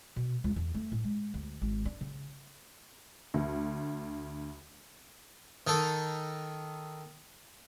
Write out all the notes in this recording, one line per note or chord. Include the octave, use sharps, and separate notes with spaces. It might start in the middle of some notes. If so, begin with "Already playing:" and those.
B2
C#2
E2
A3
A2
G#3
D2
G#1
D4
C#3
D2
D#3 D#4 A4